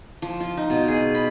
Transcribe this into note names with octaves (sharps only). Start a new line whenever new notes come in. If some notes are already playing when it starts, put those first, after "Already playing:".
F3
F4
D#4
B2
G#4
B5